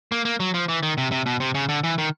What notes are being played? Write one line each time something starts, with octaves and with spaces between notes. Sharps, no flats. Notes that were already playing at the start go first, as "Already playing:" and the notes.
A#3
A#3
F#3
F3
E3
D#3
C3
C3
B2
C3
C#3
D3
E3
D#3